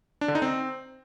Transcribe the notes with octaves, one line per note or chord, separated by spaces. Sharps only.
D4
D3
D#4
C4